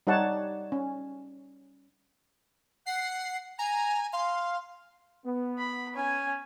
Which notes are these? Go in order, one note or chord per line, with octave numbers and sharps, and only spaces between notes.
G3 D#4 G4 C#5 F#5 A5
C#4
F#5 C7
G#5 A#5
F5 C6
B3
B5
C#4 G#5